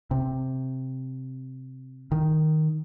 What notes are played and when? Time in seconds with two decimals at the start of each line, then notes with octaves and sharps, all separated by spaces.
0.11 C3
2.12 D#3